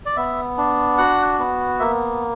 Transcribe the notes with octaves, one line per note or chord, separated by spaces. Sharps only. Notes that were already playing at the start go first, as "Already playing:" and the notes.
D5
B3 E5
D4
F#4 F#5
B3
A#3 E5